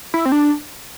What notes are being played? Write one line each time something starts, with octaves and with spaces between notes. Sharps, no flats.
E4
C4
D4